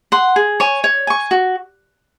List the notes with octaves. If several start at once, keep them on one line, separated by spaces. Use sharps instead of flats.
F#5 C6
G#4
C#5 G#5 C#6
C#5
G#5 C#6
F#4